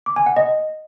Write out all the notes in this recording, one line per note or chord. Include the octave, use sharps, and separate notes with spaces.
D6
G#5
F#5
D#5